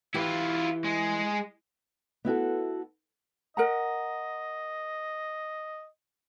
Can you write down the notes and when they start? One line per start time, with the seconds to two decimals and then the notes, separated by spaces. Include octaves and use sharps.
0.14 E3 E4 F4 G4
0.85 G#3
2.25 B3 E4 F#4 A4
3.57 A#4 D#5 F#5 A#5